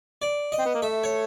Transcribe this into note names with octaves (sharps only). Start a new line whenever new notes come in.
D5
D#5
C4
B3
A#3
A3 E5
C#5